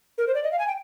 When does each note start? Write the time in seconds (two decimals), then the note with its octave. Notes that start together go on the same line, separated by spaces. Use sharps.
0.18 A#4
0.27 C5
0.34 D5
0.44 D#5
0.52 F5
0.59 G#5
0.68 G5